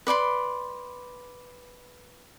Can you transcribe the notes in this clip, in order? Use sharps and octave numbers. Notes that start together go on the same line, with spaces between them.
B4 D5 B5 C6